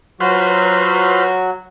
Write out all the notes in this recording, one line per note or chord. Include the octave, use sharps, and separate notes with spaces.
F#3 F4 F#4 B4 C5